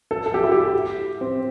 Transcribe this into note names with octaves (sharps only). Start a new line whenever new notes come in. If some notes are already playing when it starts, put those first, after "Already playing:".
A4
A4
G4
E4
G4
C4